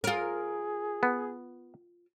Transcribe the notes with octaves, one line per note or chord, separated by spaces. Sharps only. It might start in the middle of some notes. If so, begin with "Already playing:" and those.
F4 G#4 A#4
B3